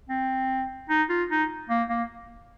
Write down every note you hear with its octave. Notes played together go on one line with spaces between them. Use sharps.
C4
D#4
F4
D#4
A#3
A#3